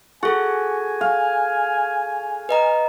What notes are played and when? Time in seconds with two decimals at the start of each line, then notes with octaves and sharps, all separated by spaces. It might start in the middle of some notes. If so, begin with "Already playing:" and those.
0.23 F#4 G#4 A4 G#5
1.01 F5
2.49 B4 D#5 A#5